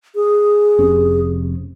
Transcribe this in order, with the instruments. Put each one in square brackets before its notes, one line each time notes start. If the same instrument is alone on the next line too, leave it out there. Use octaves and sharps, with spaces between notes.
[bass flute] G#4
[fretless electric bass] F1 C3 C#4